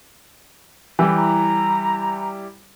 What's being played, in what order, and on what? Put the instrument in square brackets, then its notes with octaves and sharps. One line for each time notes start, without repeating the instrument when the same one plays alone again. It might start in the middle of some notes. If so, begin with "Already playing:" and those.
[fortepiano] E3 [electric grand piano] G3 E4 G4
[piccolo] A#5